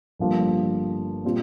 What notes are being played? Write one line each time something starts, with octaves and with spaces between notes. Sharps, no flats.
G1 G2 F3 A#3
A#2 G3 C4 F4